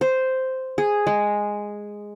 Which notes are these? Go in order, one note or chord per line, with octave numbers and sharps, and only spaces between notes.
C5
G#4
G#3